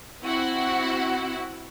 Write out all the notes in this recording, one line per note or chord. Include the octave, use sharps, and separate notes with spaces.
C4 E4 F#4 F#5